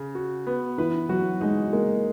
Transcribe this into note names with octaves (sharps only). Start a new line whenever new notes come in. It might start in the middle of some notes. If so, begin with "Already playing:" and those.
Already playing: C#3
F#4
B3
E3 B4
F#3 F#4
G#3 D#4
G#3 A#3